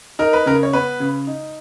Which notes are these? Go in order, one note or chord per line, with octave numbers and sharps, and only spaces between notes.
D#4 A#4
B4
C#3 A#4
C#5
B3 B4
C#3
D#4